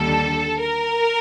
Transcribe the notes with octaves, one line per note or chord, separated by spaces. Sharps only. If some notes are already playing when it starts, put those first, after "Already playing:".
Already playing: D#2 D3 G3 A4
A#4